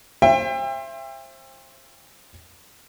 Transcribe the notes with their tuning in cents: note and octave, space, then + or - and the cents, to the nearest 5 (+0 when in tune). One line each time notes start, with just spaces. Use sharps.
C5 +25 E5 +30 G5 +35